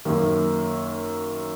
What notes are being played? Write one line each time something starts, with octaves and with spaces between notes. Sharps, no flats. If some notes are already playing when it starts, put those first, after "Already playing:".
F#2 D#3 A#3